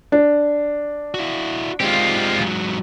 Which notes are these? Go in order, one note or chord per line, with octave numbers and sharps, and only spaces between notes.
D4
E4 F#4
G#3 C4 F4 G4
G#2 F#3